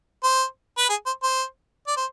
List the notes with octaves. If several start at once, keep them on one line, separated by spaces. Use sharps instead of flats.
C5
B4
G#4
C5
C5
D5
C5